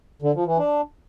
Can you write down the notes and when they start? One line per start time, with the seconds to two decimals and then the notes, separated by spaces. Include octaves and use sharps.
0.22 D3
0.34 F3
0.46 E3
0.58 D4